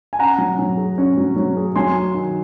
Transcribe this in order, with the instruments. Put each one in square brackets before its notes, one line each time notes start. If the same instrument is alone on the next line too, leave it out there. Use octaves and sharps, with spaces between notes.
[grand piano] G#5
[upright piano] C#4 [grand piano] F#5 A#5
[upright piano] F#3
F#3
G#4
C#4
F#3
F#3
G#4
[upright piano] F#3 [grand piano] G#5 C6
[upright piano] F#4
D#3